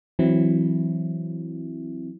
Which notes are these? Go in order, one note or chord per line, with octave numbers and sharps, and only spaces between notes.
E3 F#3 C4 E4